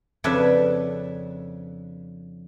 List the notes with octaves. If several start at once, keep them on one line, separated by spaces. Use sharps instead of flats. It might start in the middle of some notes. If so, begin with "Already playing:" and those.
F2 C#3 D4 B4 E5